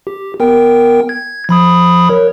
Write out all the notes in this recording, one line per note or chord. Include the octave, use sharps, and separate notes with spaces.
G4
B3 A#4 G5
G#6
F3 B5 D#6
A#4 C#5